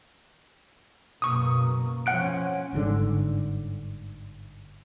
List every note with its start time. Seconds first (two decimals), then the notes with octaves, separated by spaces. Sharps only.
1.22 F#1 B2 A#3 C#6 D#6
2.06 F3 C#4 F#5 F#6 D7
2.73 G1 G#2 D3